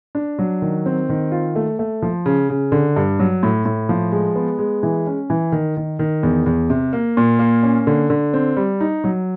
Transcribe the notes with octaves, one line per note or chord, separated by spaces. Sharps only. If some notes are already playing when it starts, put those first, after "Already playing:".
D4
F#3
D#3
C4
D#3
F4
A3
A3
F3
C#3
C#3
D3
G2
F#3
A2
A2
F3
G#3
B3
G#3
E3
C#4
E3
D#3
D#3
D#3
E2
E2
C3
A#3
A#2
A#3
C#4
D3
D3
C4
G3
D#4
F#3